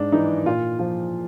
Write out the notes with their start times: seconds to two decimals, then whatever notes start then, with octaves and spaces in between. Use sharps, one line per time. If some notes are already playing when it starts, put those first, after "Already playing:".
Already playing: G#2 D4
0.12 E3 D#4
0.46 A#2 F4
0.79 F3 F4